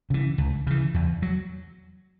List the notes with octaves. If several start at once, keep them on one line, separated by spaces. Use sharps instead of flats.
C#3 E3
C#2
C#3 E3
E2
F#3